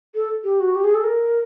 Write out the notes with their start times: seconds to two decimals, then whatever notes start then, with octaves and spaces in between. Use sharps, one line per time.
0.15 A4
0.44 G4
0.60 F#4
0.75 G4
0.84 G#4
0.95 A4
1.04 A#4